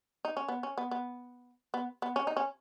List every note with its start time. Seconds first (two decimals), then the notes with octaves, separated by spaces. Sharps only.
0.25 D#4
0.37 C#4
0.49 B3
0.63 C#4
0.78 B3
0.91 B3
1.74 B3
2.02 B3
2.16 C#4
2.27 D#4
2.37 C#4